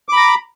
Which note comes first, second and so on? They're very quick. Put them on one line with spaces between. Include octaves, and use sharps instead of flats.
D6 B5 A#5